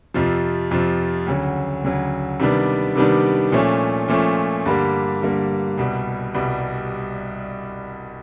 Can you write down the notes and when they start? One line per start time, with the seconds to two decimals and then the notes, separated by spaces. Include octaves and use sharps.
0.14 F2 C3 F3
0.71 F2 C3 F3
1.27 D2 C#3 F#3
1.84 D2 C#3 F#3
2.40 C3 D#3 G3 B3 D4
2.96 C3 D#3 G3 B3 D4
3.52 A#2 F3 A3 C#4
4.08 A#2 F3 A3 C#4
4.66 G2 D3 G3 A#3
5.21 G2 D3 G3 A#3
5.78 C2 B2 G3
6.34 C2 B2 G3